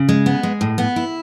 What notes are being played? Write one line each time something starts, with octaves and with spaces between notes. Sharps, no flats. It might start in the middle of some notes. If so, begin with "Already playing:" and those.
Already playing: C#3
G#3
B3
G#3
A2
B3
E4